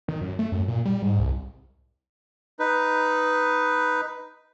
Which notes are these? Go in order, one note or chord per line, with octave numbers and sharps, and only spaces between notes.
D#3
F#2
A3
F#2
A#2
G3
G#2
C2
D#4 B4